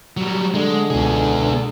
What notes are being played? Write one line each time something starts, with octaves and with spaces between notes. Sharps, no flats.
F#3 G3
D3 G#3
C#2 B2 B3 G#4